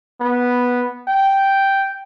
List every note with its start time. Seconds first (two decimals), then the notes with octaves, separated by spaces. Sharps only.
0.21 B3
1.08 G5